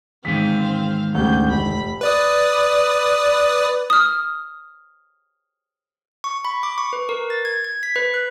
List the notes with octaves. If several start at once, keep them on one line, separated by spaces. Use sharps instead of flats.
E2 G#2 D#3 C4 F5 B6
D2 C#3 G4 G6
F1 B5
B4 D5 D#6
D#6 F6
C#6
B5
D6
C#6
B4
A#4
A6
G#6
G#6
B6
B4
F#6